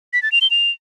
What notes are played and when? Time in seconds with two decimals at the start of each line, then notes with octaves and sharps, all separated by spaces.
0.13 B6
0.23 A6
0.32 F7
0.41 G7
0.51 F7